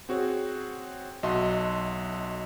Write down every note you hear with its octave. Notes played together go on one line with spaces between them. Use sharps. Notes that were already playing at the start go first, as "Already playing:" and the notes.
C4 F#4 G#4 C#5
B1 F#4 D#5 E5 A5 C6